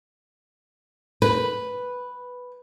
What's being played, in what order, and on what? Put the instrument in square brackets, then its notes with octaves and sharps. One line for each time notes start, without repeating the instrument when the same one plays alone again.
[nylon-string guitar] B4